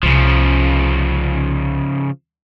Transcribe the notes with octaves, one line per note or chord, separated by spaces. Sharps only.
C2 C#3 F3